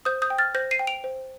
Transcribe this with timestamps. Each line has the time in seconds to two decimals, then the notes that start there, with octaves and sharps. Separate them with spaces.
0.05 C5 D#6 G6
0.22 D#6 G6
0.30 G5
0.38 F6 A6
0.55 C5 G6 A#6
0.71 C7 D#7
0.79 G5
0.87 D7 F7
1.04 C5